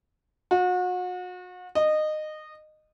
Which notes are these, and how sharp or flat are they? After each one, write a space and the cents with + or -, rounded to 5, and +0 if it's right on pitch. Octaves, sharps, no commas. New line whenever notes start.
F#4 -35
D#5 -20